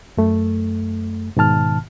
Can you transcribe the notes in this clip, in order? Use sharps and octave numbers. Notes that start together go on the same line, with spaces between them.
F#2 A3
G#2 B2 D#3 A5 F6